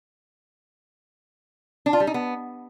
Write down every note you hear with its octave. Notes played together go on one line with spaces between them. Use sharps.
D4
F4
G3
D#4
B3